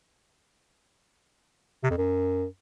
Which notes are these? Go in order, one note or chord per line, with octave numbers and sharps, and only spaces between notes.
C3
F2
F#2